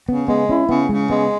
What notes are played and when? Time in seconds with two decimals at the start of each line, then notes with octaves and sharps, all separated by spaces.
0.09 C#3 B3
0.28 G#3 B3
0.48 C#4 E4
0.69 C#3 B3
0.89 C#3 G#3
1.09 G#3 B3